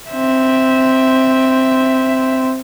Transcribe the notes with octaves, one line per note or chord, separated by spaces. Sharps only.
C4 E5